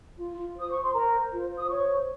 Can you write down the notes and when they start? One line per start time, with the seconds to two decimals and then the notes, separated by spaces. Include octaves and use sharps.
0.17 F4
0.37 F4
0.55 C5
0.61 D#6
0.71 C5 C#6
0.83 C6
0.94 A#4 C5 A#5
1.12 C5
1.32 F4
1.50 C5
1.59 D#6
1.69 C5 C#5 C#6
1.88 C5